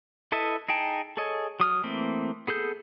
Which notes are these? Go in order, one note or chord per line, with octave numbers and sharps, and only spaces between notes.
E4 A4 B4 D#5 E5
D#4 G#4 G5 A5
G#4 A4 C#5 D#5
F#3 D#6 F6
E3 A3 A#3 C4
B3 G#4 A4 G6